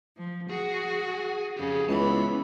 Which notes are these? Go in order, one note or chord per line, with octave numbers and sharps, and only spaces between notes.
F3
F#4 G#4
F2 C#3 G4 G#4
C#2 E3 B3 A5 B5